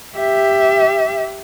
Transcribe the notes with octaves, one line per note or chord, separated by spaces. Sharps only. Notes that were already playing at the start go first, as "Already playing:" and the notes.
G4 E5